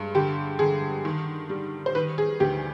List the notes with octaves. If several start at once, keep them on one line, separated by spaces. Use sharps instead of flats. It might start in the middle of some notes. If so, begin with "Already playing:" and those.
Already playing: G2 G#3
D3 G4
D3 G#4
D#3
G3
C5
D#3 B4
G#4
D2 G4